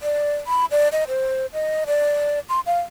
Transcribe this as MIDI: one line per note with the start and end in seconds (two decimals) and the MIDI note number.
0.01 0.35 74
0.47 0.65 83
0.71 0.88 74
0.92 1.04 75
1.08 1.46 72
1.53 1.84 75
1.87 2.40 74
2.49 2.60 84
2.66 2.80 77